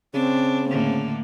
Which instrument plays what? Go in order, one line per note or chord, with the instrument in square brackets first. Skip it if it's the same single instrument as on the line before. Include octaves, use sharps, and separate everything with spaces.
[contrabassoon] C#3 [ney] C4 [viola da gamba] D4
[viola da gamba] A2 D3 A#3